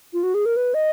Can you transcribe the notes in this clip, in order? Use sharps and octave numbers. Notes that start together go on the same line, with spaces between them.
F4
F#4
G#4
A#4
B4
D#5